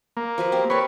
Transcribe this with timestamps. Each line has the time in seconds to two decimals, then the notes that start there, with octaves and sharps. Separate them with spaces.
0.17 A#3
0.38 F3 F#4 B4
0.52 C4 G4
0.70 A#4 B4 C#5 A5